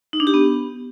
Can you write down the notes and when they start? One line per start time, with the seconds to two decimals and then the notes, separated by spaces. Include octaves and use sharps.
0.13 D#4
0.20 D4
0.27 G4
0.34 B3